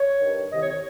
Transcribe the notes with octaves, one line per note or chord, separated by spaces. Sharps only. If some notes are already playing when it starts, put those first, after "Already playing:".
Already playing: C#5
G2 D#3
C2 C3 D#3 D#5
C#5
C#5